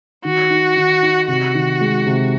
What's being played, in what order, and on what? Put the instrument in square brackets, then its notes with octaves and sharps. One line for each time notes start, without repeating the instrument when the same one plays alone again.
[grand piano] D#3 [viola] F#4
[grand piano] D#4
D#3
D#4
[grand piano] C3 [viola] F#4
[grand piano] D#3
G#3
C3